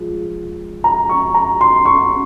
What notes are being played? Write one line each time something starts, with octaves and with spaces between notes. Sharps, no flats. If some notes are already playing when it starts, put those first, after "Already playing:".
Already playing: F3 G#3
A#5
C#6
A#5
C6
C#6